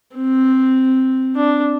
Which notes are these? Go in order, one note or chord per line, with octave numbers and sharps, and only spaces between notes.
C4
D4